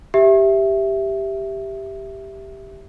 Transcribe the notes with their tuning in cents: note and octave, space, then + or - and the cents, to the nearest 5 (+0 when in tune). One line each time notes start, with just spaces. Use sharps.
G4 +0 E5 +0